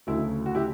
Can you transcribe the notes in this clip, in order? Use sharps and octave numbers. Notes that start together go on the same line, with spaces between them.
D2 C#3 F#3 A3 E4
F#4
E4 G4